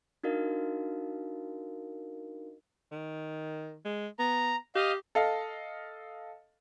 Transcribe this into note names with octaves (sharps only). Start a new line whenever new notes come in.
D4 D#4 F#4 A#4 D#5 F5
D#3
G#3
B3 A#5
G4 D#5 F5
A4 D#5 F5